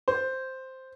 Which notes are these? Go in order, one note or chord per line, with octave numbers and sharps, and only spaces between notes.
C5